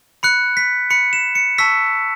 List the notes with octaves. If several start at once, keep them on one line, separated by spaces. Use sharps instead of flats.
B5 F#6 C#7
B6
B5 F#6 C#7
E7
C#7
A5 C#6 E6 B6